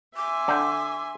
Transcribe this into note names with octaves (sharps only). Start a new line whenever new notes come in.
E5 G#5 C6 D6
D3 G5